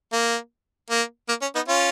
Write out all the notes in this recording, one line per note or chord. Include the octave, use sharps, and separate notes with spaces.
A#3
A#3
A#3
C#4
B3 D#4
C#4 F4